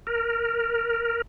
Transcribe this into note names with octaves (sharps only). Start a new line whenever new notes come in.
A#4